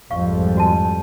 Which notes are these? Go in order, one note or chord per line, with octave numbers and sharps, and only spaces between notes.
G#1 F2 G3 F5 C#6
F#4 G#5 A5